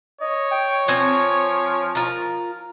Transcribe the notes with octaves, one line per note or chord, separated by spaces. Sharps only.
C#5 D#5
G5
F3 C4 G#5
F4 A#4